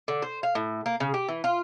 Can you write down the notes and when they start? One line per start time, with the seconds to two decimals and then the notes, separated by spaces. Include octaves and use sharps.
0.08 D3
0.22 C5
0.43 F5
0.55 A2
0.86 A#3
1.00 C#3
1.14 G4
1.29 E3
1.44 F4